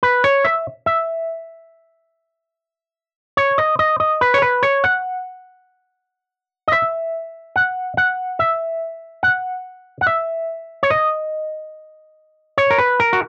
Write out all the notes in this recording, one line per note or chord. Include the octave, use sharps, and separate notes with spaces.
B4
C#5
E5
E5
C#5
D#5
D#5
D#5
B4
C#5
B4
C#5
F#5
D#5
E5
F#5
F#5
E5
F#5
F#5
E5
C#5
D#5
C#5
A#4
B4
A#4
F#4